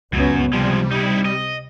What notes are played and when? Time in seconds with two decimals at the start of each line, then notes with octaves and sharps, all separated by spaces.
0.13 C#2 F#2 F#3 B3 C#4
0.53 C3 F3 G3 G#3
0.91 D#4 E4
1.25 D#5